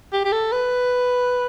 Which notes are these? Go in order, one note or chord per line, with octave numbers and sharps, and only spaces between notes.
G4
G4
A4
B4